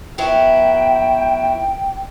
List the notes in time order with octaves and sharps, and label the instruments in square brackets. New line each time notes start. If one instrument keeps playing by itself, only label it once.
[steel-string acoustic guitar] F#3 B3 E4 [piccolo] G5